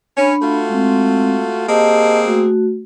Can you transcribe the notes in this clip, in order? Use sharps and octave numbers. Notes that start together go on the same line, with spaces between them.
C#4 D4 B5
A3 F4 F#4
G#3 C4
A#3 C4 G4 G#4 D#5 A5
A3 F#4